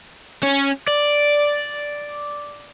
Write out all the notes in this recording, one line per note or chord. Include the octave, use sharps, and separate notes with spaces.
C#4
D5